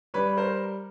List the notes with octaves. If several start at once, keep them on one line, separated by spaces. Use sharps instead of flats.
G3 B4 C#5
A#4 C5